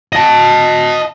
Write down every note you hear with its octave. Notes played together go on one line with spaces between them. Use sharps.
D#5 A5